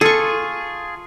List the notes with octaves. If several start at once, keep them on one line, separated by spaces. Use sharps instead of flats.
F4 G#4 A4 C#6